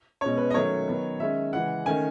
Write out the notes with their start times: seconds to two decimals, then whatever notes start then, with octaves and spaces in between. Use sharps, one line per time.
0.21 B2 G#3 C#4 C#5
0.37 B4
0.50 D#5
0.54 D#3 F#3 A3 C#4 C#5
0.88 D#3 F#3 B3
1.20 D#3 G#3 C#4 E5
1.53 C#3 E3 G#3 F#5
1.86 D#3 A3 C#4 G#5